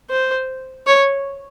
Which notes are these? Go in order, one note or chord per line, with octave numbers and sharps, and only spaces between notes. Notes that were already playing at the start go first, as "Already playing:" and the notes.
C5
C#5